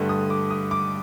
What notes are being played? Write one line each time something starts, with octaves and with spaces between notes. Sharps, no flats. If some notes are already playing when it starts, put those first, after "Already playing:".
Already playing: G2 D3 A3
D#6
D6
D#6
D6